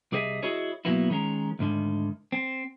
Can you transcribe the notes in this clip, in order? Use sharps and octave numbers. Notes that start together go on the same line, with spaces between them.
C2 G4 G#4 C5 D#5 E5
E4 F#4 G#4 C#5 D#5
B2 F#3 A#3 B3 E4
D#3 G#3 C#4 A#4
D2 G#2 D3 D#3
C4